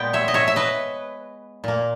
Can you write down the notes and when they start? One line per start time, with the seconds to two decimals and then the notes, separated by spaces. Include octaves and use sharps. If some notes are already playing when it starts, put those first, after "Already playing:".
Already playing: A#2 G#3 B3 G5
0.13 C#5 E5
0.28 D#5
0.34 C#5 E5
0.48 E5
0.56 B4 D#5
1.64 A#2 A#3